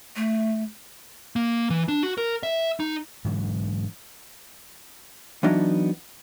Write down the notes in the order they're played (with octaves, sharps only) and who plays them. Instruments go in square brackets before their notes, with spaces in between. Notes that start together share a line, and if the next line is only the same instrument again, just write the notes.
[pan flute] A3
[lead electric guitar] A#3
E3
D4
F#4
A#4
E5
D#4
[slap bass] G#2 D3 E3 F#3
[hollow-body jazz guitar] E3 F#3 B3 D4 D#4